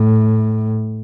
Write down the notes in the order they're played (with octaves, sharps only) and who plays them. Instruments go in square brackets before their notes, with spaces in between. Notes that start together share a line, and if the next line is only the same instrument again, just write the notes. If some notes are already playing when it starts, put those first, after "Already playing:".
Already playing: [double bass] A2